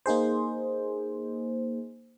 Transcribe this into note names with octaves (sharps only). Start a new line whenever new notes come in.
A#3 D#4 G#4 C5